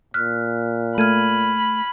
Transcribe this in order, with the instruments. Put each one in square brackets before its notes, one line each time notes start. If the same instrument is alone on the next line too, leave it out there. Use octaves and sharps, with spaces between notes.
[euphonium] A#2 [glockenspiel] F6 F#6 B6
[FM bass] A3 [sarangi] B5 [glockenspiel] F6 G#6 D#7